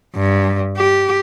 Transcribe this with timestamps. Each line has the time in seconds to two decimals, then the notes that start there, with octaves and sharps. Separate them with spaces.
0.16 G2
0.77 G4